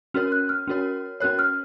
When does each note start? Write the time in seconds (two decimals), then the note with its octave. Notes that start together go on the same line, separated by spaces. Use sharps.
0.14 C#4 F#4 A#4 C#5 F6
0.32 F#6
0.49 F6
0.67 C#4 F#4 A#4 C#5
1.20 C#4 F#4 A#4 C#5 F#6
1.39 F6